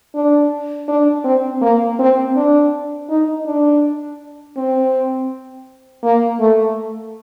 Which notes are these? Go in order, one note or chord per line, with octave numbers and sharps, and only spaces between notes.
D4
D4
C4
A#3
C4
D4
D#4
D4
C4
A#3
A3